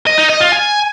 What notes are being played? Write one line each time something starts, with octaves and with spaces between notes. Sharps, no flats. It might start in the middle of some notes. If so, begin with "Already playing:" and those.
D#5
D#4
D#5
F4
G#5